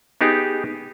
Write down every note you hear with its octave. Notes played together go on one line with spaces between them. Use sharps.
B3 D#4 G4 G#4